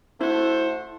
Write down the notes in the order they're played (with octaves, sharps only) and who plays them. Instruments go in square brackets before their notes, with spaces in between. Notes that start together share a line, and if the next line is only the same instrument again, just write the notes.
[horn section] A3 F#4 C5 [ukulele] E4